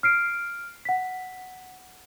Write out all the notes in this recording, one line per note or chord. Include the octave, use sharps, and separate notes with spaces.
F6 C7 D7
F#5 B6